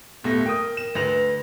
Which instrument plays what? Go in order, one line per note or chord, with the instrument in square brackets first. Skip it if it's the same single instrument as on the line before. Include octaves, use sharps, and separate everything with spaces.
[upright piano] D#1 A3 A#6 [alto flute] B3
[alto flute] A#4 [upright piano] G5 D#6
[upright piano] E7
[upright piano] D2 A#6 F7 [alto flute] B4